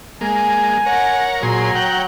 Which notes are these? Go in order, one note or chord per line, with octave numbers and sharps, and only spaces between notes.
G#3 A#3 G#5
A#4 C#5 F#5
A#2 F#3 G#4 A#5 C6
F#5 G5